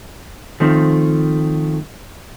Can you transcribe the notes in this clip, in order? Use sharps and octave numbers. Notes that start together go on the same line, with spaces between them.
D#3 F3 A3 C4